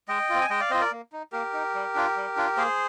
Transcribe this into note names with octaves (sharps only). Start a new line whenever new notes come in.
G#3 D#5 G5
C4 F4
G#5
G#3 D#5 G5
D5 F5
C4 F4 C5 D#5
A#4 D5
A#3
D#4
A#3 G4 A#4
D#4
G3
D4 F4
G3
D4 F4
A#3 G#4 C5